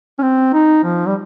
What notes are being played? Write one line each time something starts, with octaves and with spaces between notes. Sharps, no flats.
C#4
C4
D#4
F3
G3